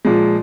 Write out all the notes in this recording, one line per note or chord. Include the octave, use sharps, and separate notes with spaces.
A#2 F3 G#3